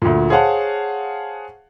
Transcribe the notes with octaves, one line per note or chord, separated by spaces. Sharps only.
D2 A#2
G#4 C5 C#5 F5 F#5 A5